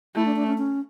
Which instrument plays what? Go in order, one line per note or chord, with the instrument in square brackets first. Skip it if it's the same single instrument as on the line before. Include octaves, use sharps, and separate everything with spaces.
[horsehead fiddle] A3 [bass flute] E4
[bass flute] D4
D4
C#4
C#4